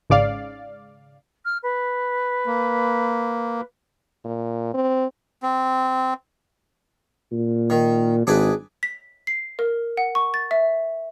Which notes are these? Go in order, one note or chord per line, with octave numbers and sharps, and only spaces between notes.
G#1 G#2 C#3 D5 F5
F6
B4
A#3
A#2
C4
C4
A#2
D#3
G#1 D4 G#4 B4
B6
C7
A#4
F#5
C#6
A6
E5